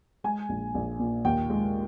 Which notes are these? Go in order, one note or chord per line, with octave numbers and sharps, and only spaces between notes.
G#3 G#5
A#1
A#1
A#2
D#2 G5
G#3